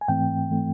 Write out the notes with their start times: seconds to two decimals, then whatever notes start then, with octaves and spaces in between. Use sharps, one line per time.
0.01 G#5
0.08 G#2 E3 A3 C4 G5
0.51 E3 A3 C4